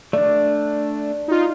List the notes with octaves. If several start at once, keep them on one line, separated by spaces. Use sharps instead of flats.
A3 D4 D5
D#4 F4